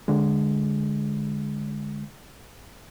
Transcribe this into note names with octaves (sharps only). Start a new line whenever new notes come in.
D3 G#3